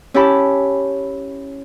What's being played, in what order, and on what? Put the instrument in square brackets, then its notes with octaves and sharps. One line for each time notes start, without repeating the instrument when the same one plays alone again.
[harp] C#4 E4 G4 A5 B5